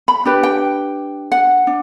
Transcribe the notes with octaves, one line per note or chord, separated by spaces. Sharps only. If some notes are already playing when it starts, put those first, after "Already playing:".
B5
D4 G4 B4
G5
F#5
D4